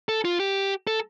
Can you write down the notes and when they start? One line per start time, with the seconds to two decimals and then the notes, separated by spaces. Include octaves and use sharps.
0.09 A4
0.25 F4
0.40 G4
0.87 A4